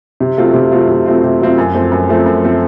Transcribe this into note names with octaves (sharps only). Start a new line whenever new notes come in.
C3
F#3 A3 C4 F4
C3
F#3 A3 C4 F4
C3
F#3 A3 C4 F4
C3
F#3 A3 C4 F4
F#2
F3 A3 C4
F#2
F3 A3 C4
F#2
F3 A3 C4